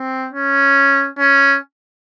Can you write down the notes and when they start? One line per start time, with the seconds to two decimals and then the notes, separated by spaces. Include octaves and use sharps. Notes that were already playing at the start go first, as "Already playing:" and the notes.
Already playing: C4
0.33 C#4
1.18 C#4